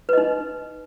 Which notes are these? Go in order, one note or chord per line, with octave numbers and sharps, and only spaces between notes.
D#4 B4 D#5